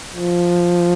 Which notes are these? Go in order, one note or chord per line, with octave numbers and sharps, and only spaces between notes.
F3